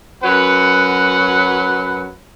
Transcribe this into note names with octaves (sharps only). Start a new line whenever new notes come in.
F#2 F#3 B4 F#5